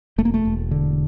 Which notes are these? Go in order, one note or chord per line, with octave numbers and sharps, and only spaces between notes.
E1 A3
A#3
A3
E1
D3